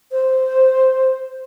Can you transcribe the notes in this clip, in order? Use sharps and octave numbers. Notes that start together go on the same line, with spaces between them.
C5